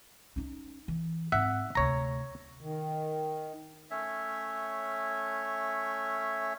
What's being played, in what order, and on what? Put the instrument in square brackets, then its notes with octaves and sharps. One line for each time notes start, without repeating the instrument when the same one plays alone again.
[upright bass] C#4 D#4
E3
[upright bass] G#2 C4 [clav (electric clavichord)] E5 F#5
[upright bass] D2 C3 [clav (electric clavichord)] C#5 A#5
[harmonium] D#3
[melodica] A3 C#4 C#5 E5